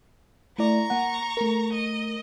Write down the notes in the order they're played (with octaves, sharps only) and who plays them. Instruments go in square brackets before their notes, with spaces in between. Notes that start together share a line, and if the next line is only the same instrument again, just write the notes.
[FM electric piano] A3 E4 D5 [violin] A#5 C#6
[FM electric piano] A#3 F#5
A3 A#4
[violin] D#5